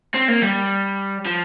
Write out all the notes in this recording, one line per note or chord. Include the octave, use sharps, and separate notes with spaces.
C4
A#3
G3
F3